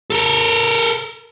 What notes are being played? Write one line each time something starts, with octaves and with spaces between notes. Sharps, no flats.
A4 A#4